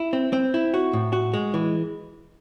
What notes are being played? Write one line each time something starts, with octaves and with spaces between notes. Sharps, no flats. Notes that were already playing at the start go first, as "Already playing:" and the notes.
Already playing: E4
C4
C4
E4
F#4
A2
F#4
G#3
E3